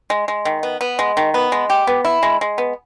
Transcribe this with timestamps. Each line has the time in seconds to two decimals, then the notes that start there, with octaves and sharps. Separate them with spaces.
0.10 G#3
0.28 G#3
0.45 D#3
0.63 B3
0.81 B3
0.99 G#3
1.17 D#3
1.34 B3
1.52 G#3
1.70 G4
1.87 B3
2.05 E4
2.23 G#3
2.41 G#3
2.58 B3